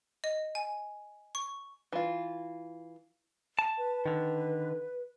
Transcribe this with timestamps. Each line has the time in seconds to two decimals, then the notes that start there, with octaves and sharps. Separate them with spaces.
0.24 D#5
0.55 G#5
1.35 C#6
1.93 E3 F4
3.59 A5
3.78 B4
4.06 D3 D#3